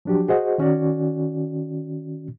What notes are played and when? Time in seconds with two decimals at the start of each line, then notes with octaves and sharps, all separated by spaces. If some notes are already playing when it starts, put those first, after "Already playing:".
0.05 F3 F#3 D4 F#4 G4
0.28 F#4 G#4 C5 D#5 F#5
0.58 D#3 C#4 F#4 D5